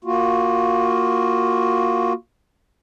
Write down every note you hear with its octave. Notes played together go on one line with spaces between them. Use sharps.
A#3 F4 F#4